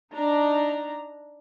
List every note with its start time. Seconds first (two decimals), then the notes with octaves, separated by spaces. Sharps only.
0.13 D4 D#4 A#5